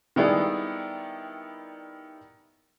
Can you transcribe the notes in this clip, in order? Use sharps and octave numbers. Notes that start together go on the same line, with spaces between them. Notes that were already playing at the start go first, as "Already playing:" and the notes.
D#3 G3 B3 D4 E4 G#4